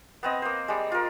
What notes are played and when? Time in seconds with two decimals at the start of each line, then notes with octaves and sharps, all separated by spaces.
0.23 B3 C4 D#5
0.42 A#3 C5
0.68 G3 G#3
0.92 F4 A#4